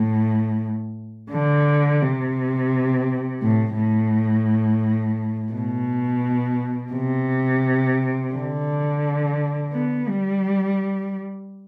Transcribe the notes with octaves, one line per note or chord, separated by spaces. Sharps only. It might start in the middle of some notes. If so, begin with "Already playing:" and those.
Already playing: A2
D3
C3
A2
A2
B2
C3
D3
B3
G3